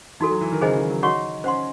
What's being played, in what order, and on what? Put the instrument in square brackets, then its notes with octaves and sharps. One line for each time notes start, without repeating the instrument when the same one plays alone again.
[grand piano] E3 [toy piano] D#4 F#4 A4
[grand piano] F#3
E3
D#3
[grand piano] C#3 [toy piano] G#4 C5 D#5 G#5
[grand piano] D#3
F#3
[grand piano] D#4 [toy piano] F#4 C#5 F#5 C#6
[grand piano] C#4 [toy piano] C5 F#5 C6